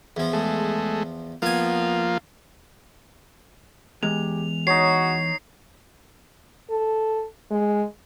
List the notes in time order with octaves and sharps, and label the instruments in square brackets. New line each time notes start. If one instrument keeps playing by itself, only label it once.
[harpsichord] E2 F3
[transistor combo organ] G#3 A3
[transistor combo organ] F3 A#3 F4 [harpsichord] B3 G#5
[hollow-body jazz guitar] E2 G#3 [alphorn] G4 [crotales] F7
[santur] D#4 C#5 [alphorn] F#4 [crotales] C7
[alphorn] A4
G#3